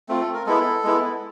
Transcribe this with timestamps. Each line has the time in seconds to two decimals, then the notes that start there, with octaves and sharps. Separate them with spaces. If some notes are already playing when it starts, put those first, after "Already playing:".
0.09 A3 C4 F4
0.21 A4
0.34 A#4
0.46 G#3 B3 E4 A4
0.84 G#3 B3 E4